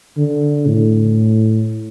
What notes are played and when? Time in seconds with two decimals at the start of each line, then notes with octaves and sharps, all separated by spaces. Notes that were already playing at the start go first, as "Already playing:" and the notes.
0.18 D3
0.67 A2